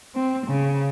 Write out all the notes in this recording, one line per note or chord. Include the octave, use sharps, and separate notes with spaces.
C4
C#3